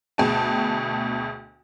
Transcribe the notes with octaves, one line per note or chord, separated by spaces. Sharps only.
D2 B2 G#4 G5 A5